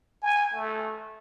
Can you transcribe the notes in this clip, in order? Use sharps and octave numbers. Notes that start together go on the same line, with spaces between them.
G#5
A3